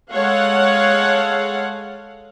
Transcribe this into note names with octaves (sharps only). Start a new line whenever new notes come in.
G#3 A4 C#5 F5 F#5